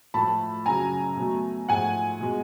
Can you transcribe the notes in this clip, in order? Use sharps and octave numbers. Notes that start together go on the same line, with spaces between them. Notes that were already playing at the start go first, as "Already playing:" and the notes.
A2 F3 A3 A5 B5
F#2 C#3 F#3 G#5 A#5
B2 F#3 A3
G#2 F3 A3 F#5 G#5
B2 G#3